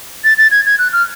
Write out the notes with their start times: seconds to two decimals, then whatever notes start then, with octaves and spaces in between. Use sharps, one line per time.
0.24 A6
0.38 A6
0.51 G#6
0.66 G#6
0.79 F#6
0.93 F6